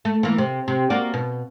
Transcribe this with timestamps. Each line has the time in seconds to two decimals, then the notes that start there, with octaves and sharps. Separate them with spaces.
0.05 A3
0.23 E3 A#3
0.38 C3
0.68 C3
0.90 A#3 F#4 D5
1.14 B2